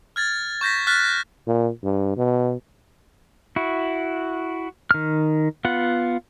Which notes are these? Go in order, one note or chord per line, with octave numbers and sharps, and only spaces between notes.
F6 G#6 A6
C#6 G6 A#6 B6
F6 F#6 A6 B6
A#2
G2
B2
E4 F#4
D#3 F6
B3 F4 F#5